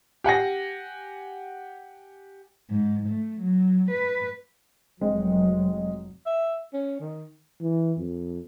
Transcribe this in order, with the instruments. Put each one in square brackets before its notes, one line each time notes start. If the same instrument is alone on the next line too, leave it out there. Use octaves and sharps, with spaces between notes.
[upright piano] G4 F#5 G#5 A#6
[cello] G#2
A3
F#3
B4
[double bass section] F1 F#3 [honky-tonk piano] G#3 C4
[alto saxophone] E5
C#4
D#3
[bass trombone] E3
F2